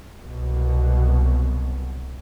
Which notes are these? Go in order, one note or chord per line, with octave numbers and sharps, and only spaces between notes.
C2 B2 F#3